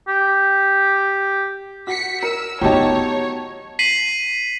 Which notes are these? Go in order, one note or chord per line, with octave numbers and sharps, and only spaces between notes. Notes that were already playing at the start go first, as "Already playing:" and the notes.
G4
F#4 B6 C#7
A#4 E6
F#3 B3 D#4 F4 G4 C#5 A5
B6 C7 D#7 F#7